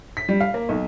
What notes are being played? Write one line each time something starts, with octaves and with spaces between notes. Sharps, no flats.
B6
G3
F5
A#3
B1